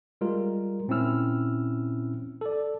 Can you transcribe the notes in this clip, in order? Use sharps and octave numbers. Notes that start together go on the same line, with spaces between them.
G3 G#3 F4 A#4
A#2 C4 C#4 E4 E6 F6
A4 D5